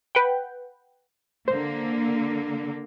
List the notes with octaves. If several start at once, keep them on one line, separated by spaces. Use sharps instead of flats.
B4 F#5 G5
D3 A#3 C5